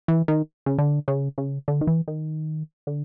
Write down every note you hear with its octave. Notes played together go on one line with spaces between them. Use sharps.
E3
D#3
C#3
D3
C#3
C#3
D3
D#3
E3
D#3
D3